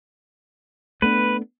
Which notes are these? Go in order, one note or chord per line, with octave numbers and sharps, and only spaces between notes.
A3 B3 D4 B4